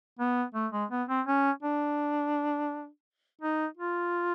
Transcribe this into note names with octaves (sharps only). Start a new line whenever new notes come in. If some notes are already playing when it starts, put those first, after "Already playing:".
B3
A3
G#3
B3
C4
C#4
D4
D#4
F4